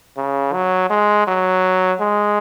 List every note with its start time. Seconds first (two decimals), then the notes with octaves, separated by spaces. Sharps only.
0.17 C#3
0.53 F#3
0.90 G#3
1.27 F#3
2.00 G#3